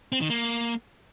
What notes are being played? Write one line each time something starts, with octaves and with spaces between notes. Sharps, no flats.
C4
D#3
A#3